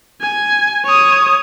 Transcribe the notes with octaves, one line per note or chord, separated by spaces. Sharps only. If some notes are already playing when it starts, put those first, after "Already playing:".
G#5
C#5 D#6